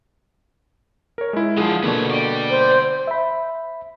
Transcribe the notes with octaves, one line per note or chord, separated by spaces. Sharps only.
A#4 C#5
G#3 E4
D3 F3 F4 G#4
B2 D3 A#3 B3 C#5
D5 G5
C5
E5 B5